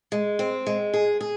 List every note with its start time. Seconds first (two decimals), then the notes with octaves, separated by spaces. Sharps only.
0.12 G#3
0.39 C4
0.67 G#3
0.94 G#4
1.21 G#4